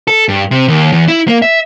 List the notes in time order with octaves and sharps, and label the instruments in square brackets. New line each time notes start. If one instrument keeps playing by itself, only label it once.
[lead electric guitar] A4
G2
C3
D#2
E2
E4
A#3
E5